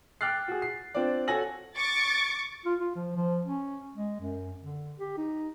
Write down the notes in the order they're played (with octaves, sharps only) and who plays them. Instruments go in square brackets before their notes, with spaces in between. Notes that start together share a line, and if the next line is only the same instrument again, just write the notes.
[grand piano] G5 D6 F6 F#6 A6 C7
F#4 G#4
C7
C4 D4 F4 D5
F#4 A4 C#5 G#5 A#6 F#7
[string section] C#6 D6 A6
[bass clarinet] F4
F4
F3
F3
C#4
G#3
F#2
D3
G4
D#4